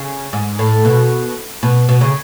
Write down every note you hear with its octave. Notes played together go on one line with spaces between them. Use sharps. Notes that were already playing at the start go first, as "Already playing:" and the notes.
Already playing: C#3
G#2
A2
B2
B2
B2
C#3